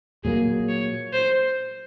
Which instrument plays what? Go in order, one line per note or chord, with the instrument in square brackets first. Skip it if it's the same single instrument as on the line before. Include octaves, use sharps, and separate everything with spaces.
[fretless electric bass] A#2 F#3 A#3 [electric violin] G#4
[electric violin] C#5
C5